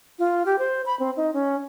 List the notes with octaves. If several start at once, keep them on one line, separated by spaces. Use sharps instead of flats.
F4
G4
C5
B5
C4
D#4
C#4